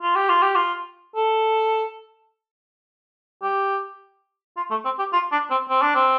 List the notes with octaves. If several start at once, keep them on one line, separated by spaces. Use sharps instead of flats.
F4
G4
F4
G4
F4
A4
G4
F4
A3
C4
G4
F4
D4
C4
C4
D4
C4